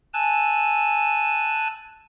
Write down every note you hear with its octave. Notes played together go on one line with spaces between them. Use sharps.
G#5 A5 E6 F#6